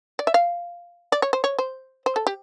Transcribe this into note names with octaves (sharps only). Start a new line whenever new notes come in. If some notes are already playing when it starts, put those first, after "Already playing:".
D5
E5
F5
D5
C#5
C5
C#5
C5
C5
A4
G4